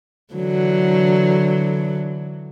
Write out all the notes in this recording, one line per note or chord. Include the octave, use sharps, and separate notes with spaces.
D3 E3 F#3